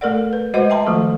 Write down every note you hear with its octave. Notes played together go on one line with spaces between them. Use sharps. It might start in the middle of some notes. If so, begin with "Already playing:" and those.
A3 A4 A#4 D5 F#5
B4
G#3 F#4 B4 C5 D#5 F#5
E5 G5 A5 A#5 C6
D#3 F3 A3 F4 A4